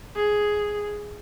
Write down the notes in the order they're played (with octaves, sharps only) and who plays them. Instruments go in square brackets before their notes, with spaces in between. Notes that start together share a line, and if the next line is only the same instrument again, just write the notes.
[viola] G#4